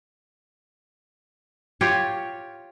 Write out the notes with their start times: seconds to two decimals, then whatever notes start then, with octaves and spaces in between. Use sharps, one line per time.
1.81 F4 G4 C#5